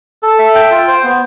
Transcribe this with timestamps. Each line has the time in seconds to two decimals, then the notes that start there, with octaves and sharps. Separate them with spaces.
0.23 A4
0.39 E5
0.55 G5
0.71 F4
0.88 C5
1.04 B3